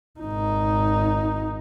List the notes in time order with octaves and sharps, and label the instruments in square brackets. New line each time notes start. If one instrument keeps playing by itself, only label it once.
[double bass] G#1 D#4